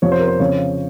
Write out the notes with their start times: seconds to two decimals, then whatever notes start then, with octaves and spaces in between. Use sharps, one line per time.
0.02 F2 C3 F3 C#5
0.12 C5
0.20 A#4
0.28 C5
0.40 F2 C#3 F3 C#5